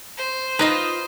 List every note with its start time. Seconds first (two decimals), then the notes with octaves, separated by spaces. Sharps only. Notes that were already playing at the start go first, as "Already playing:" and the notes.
0.17 C5
0.59 D#4 F4 B4 D#5